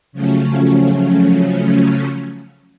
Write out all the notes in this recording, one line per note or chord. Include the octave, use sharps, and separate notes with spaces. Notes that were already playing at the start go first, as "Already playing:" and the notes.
C#3 F3 F#3 A3 C#4